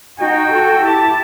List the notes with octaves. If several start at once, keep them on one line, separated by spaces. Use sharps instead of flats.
D#4 F#4 G5
F#4 A4
E4 G4 A5